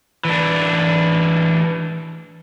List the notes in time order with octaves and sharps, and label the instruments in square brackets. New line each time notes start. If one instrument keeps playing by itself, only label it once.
[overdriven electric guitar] E3 D4